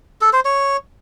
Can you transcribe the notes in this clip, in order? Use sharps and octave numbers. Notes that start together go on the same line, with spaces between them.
A4
C5
C#5